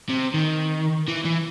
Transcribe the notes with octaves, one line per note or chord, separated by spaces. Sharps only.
C3
D#3
E3
E3